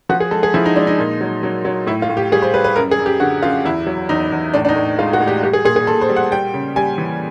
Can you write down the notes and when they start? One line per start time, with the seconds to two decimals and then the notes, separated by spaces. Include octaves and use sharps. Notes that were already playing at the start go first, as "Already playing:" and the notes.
0.09 F3 F#4
0.20 G#4
0.31 G#3 A4
0.43 G#4
0.54 F3 E4
0.66 D#4
0.76 G#3 D4
0.87 D#4
0.99 A#2
1.21 F#3
1.43 F#3
1.65 F#3
1.87 A2 E4
2.02 F4
2.09 A2
2.17 G4
2.32 G3 G#4
2.42 C5
2.54 G3 B4
2.64 B4
2.76 F#2 A#4
2.91 G#4
2.99 F#2
3.06 G4
3.20 D3 F#4
3.42 F#2 F4
3.65 E2 E4
3.87 F#3
4.09 E2 D#4
4.32 E2
4.54 A2 D4
4.65 D4
4.69 D#4
4.76 A2
4.99 G#3 F4
5.13 F#4
5.20 A2
5.27 G4
5.42 G3 G4
5.53 G#4
5.65 A#2 G#4
5.76 G#4
5.87 A#2 A4
6.01 C5
6.09 G3
6.16 F#5
6.31 G3 G5
6.54 C#3
6.76 G3 G#5
6.98 E3